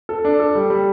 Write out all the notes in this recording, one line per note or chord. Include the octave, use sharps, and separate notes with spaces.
A4
D4
A4
G3
G3